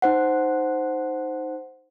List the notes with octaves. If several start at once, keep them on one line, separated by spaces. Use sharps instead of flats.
D#4 C5 F#5